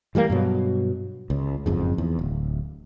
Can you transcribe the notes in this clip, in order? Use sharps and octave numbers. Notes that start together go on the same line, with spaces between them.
E3 G3 G#3 A#3
G2 B2 F#3
C#2
F#1 F2 G#2
E2
D1